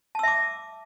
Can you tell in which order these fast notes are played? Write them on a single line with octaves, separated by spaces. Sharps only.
A5 E6 E5 D6